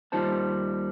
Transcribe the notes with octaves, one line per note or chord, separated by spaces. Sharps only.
D#2 G3 D#4 F4 C5 A5